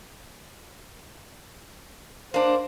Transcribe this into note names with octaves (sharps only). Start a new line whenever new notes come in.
A#3 D4 C5